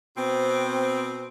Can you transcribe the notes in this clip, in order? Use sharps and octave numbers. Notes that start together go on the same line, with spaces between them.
B2 C4